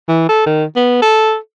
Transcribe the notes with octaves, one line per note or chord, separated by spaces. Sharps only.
E3
A4
D#3
B3
A4